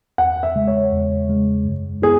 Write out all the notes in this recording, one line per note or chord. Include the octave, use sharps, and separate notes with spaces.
E2 F#5
E5
C#3 G#3
C#5
E2
C#3 G#3
F#2
B3 E4 G#4